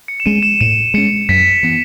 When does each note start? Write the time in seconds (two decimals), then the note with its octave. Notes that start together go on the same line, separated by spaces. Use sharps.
0.08 C#7
0.20 E7
0.26 G#3 C#4 D#7
0.43 E7
0.60 A2 D#7
0.94 G#3 C#4 C#7
1.29 F#2 B6
1.63 E3 B3